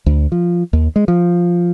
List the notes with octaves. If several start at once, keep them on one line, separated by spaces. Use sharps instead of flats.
D2
F3
D#2
G#3
F3